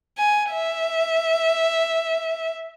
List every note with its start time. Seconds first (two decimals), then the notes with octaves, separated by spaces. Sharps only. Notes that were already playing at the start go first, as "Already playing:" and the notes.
0.18 G#5
0.52 E5